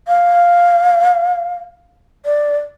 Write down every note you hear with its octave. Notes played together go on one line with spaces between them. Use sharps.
F5
D5